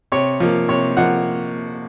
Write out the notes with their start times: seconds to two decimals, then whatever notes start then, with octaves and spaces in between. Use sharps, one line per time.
0.12 C3 C#5
0.40 F3 A#3
0.69 C3 C#5
0.97 F3 A#3 F#5